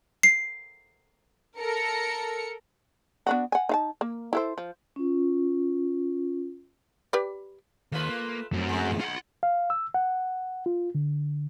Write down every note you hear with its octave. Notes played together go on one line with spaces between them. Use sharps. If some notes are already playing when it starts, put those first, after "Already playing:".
C7
A4 A#4 C#7
B3 D4 F#4
F#5 G#5
D#4 F5 A5
A#3
E4 A4 C5
F3
C#4 F4
G4 B4 D5
D#2 A3 F4 B4
A#3
F#2 A3 C4
G#3
F4 F#5 B5
F5
E6
F#5
F4
D3